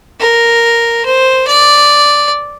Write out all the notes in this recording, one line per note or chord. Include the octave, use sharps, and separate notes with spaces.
A#4
C5
D5